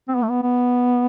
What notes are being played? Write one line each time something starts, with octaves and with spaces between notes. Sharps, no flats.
C4
B3
A3
B3
B3